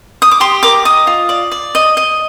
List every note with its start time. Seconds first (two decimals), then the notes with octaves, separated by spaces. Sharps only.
0.22 D#6
0.31 D6
0.40 G4 C6
0.63 A#4 D6
0.85 D#5 D#6
1.07 F4
1.29 D5
1.52 D5
1.75 D#5
1.97 D#5